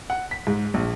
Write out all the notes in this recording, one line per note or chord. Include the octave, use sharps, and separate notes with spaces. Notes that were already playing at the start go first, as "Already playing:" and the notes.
F#5
B6
G#2
A#1